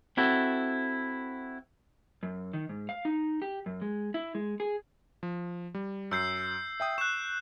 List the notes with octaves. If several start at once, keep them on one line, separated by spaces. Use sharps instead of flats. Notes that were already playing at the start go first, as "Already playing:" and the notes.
C4 E4 F#4 A4
F#2
D#3
G#2
F5
D#4
G4
F#2
G#3
E4
G#3
G#4
F3
G3
F#2 E6 G6 C7
E5 G5 D#6
C#6 F#6 E7